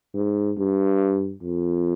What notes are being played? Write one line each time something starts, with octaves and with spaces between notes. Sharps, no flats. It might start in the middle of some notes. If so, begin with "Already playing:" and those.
G#2
G2
F2